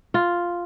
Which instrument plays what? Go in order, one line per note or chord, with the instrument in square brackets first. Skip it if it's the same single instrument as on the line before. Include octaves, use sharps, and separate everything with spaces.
[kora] F4